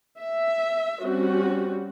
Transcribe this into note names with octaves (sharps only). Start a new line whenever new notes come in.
E5
G3 C4 C#4 F#4